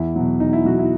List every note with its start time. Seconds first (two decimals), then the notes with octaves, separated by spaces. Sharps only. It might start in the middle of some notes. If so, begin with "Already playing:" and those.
Already playing: E2 E4
0.16 B2 F#3
0.40 E2 D#4
0.53 E4
0.65 B2 F#3 F#4
0.79 E4